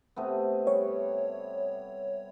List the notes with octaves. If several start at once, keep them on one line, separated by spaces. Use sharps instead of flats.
C3 A3 B3
G3 C#5